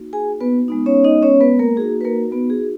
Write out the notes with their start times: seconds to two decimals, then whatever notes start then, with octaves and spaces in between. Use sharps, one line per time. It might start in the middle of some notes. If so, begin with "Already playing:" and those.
Already playing: A#3 D#4 F#4
0.13 G#4 G#5
0.41 B3 B4
0.68 G#3 B3 D#4
0.86 C#4 C#5
1.04 D#4 D#5
1.23 C#4 C#5
1.41 B3 B4
1.59 A#3 A#4
1.77 A#3 D#4 F#4 G#4
2.01 B4
2.05 A#3 A#4
2.31 B3 B4
2.50 G#4